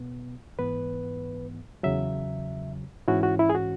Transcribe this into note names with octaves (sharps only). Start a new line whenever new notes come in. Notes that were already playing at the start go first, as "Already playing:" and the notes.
Already playing: B2 B3
G#2 E3 B3 B4
E2 C#3 F#3 E5
G#2 E3 C#4 E4 F#4
F#4
E4
G#4
F#4